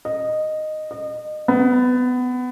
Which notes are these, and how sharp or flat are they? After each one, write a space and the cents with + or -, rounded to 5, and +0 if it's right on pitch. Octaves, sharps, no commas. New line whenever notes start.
D#5 -10
D#5 -30
B3 +20